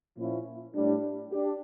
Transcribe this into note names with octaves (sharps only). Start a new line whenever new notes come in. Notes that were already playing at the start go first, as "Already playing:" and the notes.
A#2 F3 C#4 E4
A2 G3 D4
D4 G4